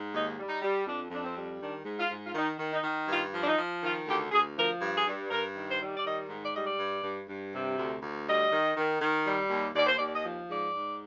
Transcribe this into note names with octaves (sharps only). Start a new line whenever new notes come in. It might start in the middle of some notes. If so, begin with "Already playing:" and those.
Already playing: G#2
D#2 D#4
G3
D#4
G3
F2 D4
F2 D4
C4
G3
D#3 D4
G#2
F4
G#2
F4
D#3 D#4
D#3
D#4
D#3
G2 F4
F3
D4
D#4
F3
D#3 F4
D2 G4
D2 G#4
F3 A#4
G2
G#4
G2
G2 A#4
D#3
C5
G3
D5
D#3 D#5
G#2
D5
G3 D#5
D5
G2
G2
G2
C3
D2
D2
G3 D#5
D#3
D#3
D#3
G3
D#2
D#2 D5
C5
D5
D#2
D5
D#5
F3
G#2 D5
G#2